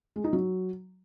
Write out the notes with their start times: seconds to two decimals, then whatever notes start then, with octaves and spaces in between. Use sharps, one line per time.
0.16 G#3
0.24 D#4
0.33 F#3